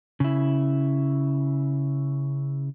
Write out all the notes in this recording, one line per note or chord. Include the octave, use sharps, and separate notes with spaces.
C#3 E4